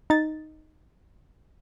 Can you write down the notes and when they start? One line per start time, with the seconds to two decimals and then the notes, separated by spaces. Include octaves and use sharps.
0.10 D#4 A6